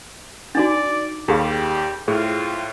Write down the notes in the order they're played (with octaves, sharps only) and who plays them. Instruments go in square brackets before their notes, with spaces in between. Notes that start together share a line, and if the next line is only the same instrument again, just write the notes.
[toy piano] D4 D#4 F#4 [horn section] D5 [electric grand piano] D6 A6
[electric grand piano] D#2 [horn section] G3 [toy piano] G4 G#4 F5
[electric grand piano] A2 [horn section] C4 F4 [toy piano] G#4